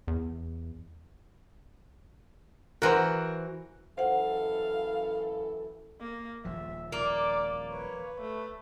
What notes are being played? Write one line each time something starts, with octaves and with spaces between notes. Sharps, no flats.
E2
E3 F#4 A#4 C5
F#2 E3 A4 C5 F5 F#5
A#3
D#1 F3 E5
A#3 D5 D6
B4 C#5
A3